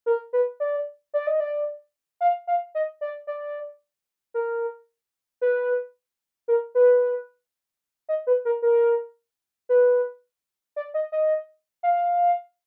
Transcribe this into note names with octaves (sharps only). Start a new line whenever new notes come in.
A#4
B4
D5
D5
D#5
D5
F5
F5
D#5
D5
D5
A#4
B4
A#4
B4
D#5
B4
A#4
A#4
B4
D5
D#5
D#5
F5